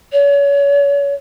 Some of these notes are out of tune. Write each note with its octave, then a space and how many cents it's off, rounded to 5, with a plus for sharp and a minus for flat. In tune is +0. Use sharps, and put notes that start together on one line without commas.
C#5 +35